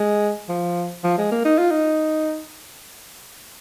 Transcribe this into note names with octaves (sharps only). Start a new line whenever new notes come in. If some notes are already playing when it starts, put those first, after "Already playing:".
Already playing: G#3
F3
F3
G#3
A#3
D#4
F4
D#4